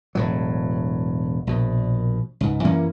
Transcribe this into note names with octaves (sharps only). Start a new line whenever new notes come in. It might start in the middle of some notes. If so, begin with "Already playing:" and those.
E1 A2 F#3
A#1 B2
C#2 G#2
F#2 E3 A#3 C#4